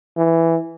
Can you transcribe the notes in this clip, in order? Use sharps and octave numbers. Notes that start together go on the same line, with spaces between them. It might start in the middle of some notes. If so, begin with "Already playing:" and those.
E3